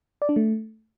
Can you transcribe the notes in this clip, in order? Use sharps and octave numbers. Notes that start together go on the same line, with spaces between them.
D5
D4
A3